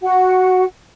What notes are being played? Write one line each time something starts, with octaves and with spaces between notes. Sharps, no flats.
F#4 F#5